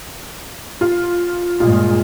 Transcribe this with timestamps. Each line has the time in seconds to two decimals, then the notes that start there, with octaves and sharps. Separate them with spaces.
0.81 F4
1.60 G2 A#2 G#3 F4